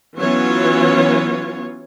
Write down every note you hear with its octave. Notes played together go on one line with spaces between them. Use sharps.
E3 F#3 B3 C#4 F4 C#5